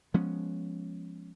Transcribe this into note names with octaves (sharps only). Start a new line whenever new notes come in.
F3 G#3 B3 C#4